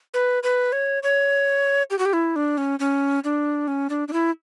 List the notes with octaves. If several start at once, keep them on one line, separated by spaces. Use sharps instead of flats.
B4
B4
C#5
C#5
G4
F#4
G4
E4
D4
C#4
C#4
D4
C#4
D4
D4
E4